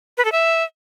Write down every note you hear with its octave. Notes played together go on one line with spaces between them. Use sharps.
B4
A4
E5